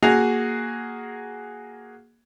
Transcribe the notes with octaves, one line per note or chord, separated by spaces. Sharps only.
A#3 F#4 G#4 F7